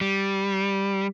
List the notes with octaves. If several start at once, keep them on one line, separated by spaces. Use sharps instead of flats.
G3